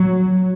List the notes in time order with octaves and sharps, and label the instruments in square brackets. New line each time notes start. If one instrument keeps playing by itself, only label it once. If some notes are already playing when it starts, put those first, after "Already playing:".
Already playing: [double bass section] F#3